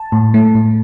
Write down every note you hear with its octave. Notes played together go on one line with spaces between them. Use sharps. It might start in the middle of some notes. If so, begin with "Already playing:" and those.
Already playing: A5
A2
A3
A2